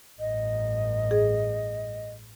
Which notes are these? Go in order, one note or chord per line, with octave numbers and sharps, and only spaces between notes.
A1 G2 D#5
G#4